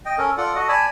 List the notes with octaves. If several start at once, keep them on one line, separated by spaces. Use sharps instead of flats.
D#5 G5
C#4 A4 A#4
F4 A4 D5 F#5
F#4 A4 D#5 F#5
D5 G#5 A5 B5